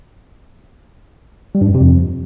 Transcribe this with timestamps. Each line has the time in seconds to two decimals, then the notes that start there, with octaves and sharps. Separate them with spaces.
1.55 G3
1.61 G2
1.68 F#2
1.74 C3
1.81 F2